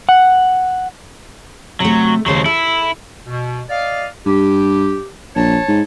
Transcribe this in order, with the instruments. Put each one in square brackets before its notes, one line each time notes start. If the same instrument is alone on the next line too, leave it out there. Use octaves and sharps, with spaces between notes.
[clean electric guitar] F#5
[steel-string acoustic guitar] C3 A3 [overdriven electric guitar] F#3
[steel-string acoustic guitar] D#2 C#3 A3 [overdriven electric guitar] F#3 C5
[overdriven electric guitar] E4 [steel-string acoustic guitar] A4
[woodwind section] B2
D5 D#5 F5
[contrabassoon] G2 [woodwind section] G4
[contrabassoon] A#1 [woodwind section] C#5 A5
[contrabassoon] G#2